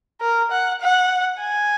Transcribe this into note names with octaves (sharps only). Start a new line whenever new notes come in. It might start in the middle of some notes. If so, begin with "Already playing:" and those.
A#4
F#5
F#5
G#5